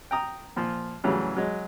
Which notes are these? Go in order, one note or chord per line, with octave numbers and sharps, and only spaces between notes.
G5 A#5 D#6
A#2 F3 F4
A2 C#3 E3 F#3 G3
F#3 G#3